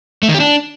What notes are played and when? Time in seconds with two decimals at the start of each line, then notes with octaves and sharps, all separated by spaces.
0.23 A3
0.28 D#3
0.34 G4
0.40 D4